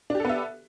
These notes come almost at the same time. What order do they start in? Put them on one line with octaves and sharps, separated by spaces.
D4 G4 A4 B3 E5